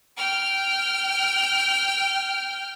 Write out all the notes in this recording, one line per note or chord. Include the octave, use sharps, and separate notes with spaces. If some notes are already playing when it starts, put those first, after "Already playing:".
G5 F6